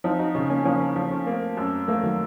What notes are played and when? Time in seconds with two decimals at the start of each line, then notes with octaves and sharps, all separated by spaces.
0.04 F3 C4 D#4
0.19 D#4 F#4
0.35 C#3 C#4 F4
0.50 A#3 C#4
0.65 F3 A#3 C#4
0.96 F3 F4 A4
1.11 C#4 F4
1.26 A3 A#3 C4
1.57 F#2
1.88 F3 A3 A#3
2.03 D#3 F#3